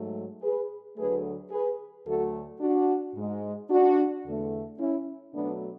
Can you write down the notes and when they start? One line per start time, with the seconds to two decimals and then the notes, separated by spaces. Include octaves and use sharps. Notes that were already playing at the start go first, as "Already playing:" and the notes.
Already playing: G#2 F#3 A3
0.42 G#4 B4
0.97 D2 D3 F#3 A3 G#4 B4
1.51 G#4 B4
2.06 D2 D3 F#3 A3 F#4 A4
2.60 D4 F#4
3.15 G#2 G#3
3.70 D4 F#4
4.23 E2 D3 A3
4.78 C#4 E4
5.33 B2 F#3 A3 B3 D4